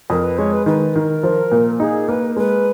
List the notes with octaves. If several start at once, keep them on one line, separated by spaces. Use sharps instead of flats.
F2 A#4
B4
G#3 C#5
B4
D#3 B4
D#3 A#4
F3
A#2
D#4 G#4
A#3 B4
G#3 B4